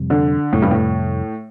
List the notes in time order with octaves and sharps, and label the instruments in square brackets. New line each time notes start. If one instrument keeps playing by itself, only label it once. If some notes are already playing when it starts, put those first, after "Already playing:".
Already playing: [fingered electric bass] F2 C3 G3
[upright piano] D3
[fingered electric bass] F2 C3 G3 [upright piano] A2
[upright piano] G2
A2